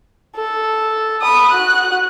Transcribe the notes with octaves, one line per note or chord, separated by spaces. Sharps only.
A4
B5 D#6
F#4 F#6